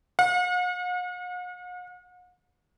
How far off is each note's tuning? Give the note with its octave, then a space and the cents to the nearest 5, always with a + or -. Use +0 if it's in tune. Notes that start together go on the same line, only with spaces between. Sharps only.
F#5 -45